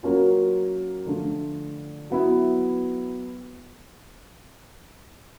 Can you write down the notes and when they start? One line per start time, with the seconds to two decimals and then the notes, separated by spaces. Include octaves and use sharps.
0.03 F#3 A#3 C#4 F4
1.06 D3 F3 A3 D4 F4
2.10 F#3 B3 E4